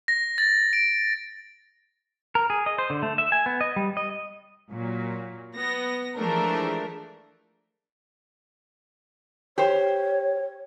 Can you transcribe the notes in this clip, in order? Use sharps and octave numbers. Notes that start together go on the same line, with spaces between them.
A#6
A6
D7
A#4
G#4
D#5
C5
D3
A3
E5
G#5
B3
D#5
G3
D#5
A#2 F#3
B3 A#6
E3 F3 G#3 A3 D4 A#4
G4 C5 C#5